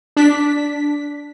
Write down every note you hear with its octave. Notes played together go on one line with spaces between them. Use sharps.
D4 B6